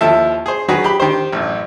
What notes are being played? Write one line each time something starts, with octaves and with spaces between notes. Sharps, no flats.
D#2 F3 E4 A4 E5
G#4 C5
D#3 F#3 F#4 G#4 B4
G4 B5
D#3 G4 C5
A1 F#2